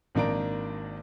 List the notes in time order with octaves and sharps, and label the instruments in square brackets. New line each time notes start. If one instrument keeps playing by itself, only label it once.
[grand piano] G#1 D#3 A#3 D4 A#5 D7